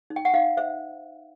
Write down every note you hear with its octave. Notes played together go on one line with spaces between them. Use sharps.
D#4
G5
F#5
D#4 F5
C5 E5